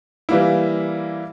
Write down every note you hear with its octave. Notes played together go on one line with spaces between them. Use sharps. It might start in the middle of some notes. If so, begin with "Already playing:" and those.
E3 G3 A#3 E4